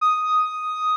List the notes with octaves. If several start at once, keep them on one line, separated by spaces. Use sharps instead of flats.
D#6